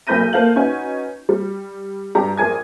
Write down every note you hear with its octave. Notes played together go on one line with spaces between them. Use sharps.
B1 A#3 B5 G6 A#6 D#7
A#3 A4 C5 F5 G6 F#7
C#4 D#4 F#4 B4 G#5
G3
G2 G4 A#5
A#1 G#4 A#4 G#5 G#6